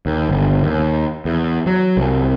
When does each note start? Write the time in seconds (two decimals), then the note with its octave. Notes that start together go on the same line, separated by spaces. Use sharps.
0.06 D#2
0.29 G1
0.63 D#2
1.25 E2
1.66 F#3
1.97 C2